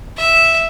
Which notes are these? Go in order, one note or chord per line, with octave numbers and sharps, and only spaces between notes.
E5